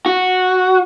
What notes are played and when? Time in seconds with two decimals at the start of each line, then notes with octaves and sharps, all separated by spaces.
0.06 F#4